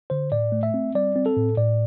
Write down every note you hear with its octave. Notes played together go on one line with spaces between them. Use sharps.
D3 C5
A2 D5
A3
E5
C4
G3 D5
C4
A4
A2
A2 D5